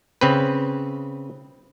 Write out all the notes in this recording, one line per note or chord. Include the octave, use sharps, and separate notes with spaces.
C#3 C4 B4